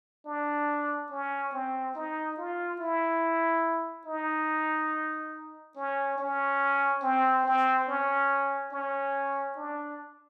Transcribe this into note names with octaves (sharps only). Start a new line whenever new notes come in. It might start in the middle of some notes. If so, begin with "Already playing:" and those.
D4
C#4
C4
D#4
F4
E4
D#4
C#4
C#4
C4
C4
C#4
C#4
D4